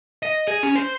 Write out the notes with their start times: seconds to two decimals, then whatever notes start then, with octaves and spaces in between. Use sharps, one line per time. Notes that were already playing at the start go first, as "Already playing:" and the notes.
0.23 D#5
0.48 G#4
0.63 C#4
0.76 C5